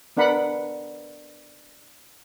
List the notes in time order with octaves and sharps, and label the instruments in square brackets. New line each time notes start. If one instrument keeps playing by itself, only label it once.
[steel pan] B3 D4 A#4 F#5 B5